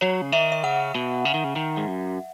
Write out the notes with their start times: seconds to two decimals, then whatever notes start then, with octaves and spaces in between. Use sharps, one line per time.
0.01 F#3 C#5
0.21 C#3
0.32 D#3 E5
0.52 E5
0.63 C#3 F#5
0.95 B2
1.25 C#3
1.34 D#3
1.44 C#3
1.56 D#3
1.77 G#2
1.88 F#2